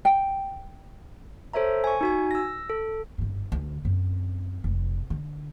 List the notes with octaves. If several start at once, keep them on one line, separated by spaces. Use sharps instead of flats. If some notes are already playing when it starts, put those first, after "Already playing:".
G5
A4 C5 C#5 E5 A#5
G#5 C#6
D#4 F#4 G#5
E6 A#6
A4
G1 G#2
D2
F#2 C4
F1
D3